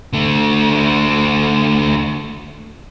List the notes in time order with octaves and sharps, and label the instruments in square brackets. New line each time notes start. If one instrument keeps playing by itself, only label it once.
[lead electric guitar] D3 A3